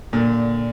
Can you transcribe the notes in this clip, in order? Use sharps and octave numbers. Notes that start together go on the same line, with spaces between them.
A#2 D3 A#3